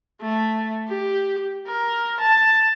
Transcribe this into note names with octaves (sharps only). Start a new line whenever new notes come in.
A3
G4
A#4
A5